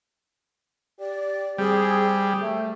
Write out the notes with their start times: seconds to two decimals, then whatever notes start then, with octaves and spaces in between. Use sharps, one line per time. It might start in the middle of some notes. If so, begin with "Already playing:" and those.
0.99 G4 D5
1.58 G3 C4 G#4
2.42 A3